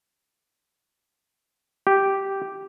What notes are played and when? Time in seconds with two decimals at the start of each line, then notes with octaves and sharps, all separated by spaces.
1.87 G4